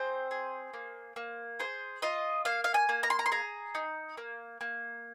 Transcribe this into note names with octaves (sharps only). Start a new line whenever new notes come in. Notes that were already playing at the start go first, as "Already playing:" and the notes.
Already playing: C4 G#4 C5
G#4
A#3
A#3
G#4 C5
F4 D#5
A#3 F5
F5
G#5
A#3
A#5
C6
A#5
C6
G#4 A#5
D#4
A#3
A#3